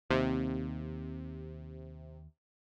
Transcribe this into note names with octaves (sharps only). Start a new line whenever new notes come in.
D#2 C3